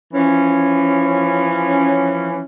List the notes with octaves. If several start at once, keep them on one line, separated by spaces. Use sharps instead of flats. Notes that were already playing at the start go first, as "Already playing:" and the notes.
E3 F3 C#4